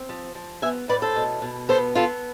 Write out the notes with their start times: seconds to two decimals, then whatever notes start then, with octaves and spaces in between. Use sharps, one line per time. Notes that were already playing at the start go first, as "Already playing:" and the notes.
Already playing: C4
0.09 F3
0.35 F3
0.62 B3 E5 G#5
0.88 A2 B4 D5
1.02 A4 C5
1.16 B2
1.42 B2
1.69 B3 A4 C5
1.95 B3 F4 A4